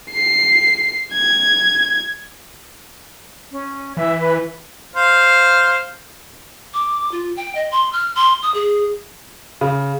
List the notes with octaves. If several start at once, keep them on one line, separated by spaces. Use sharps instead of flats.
C7
G#6
C#4
E3 E5
B4
C5 F5
D6
F4
G5
D#5
C6
F6
C6
D#6
G#4
C#3